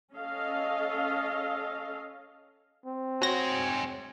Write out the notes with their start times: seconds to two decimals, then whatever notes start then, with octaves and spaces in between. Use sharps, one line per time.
0.15 C#4 A4 D#5 F5
2.86 C4
3.22 F#4 G#4 C5 C#5 A#6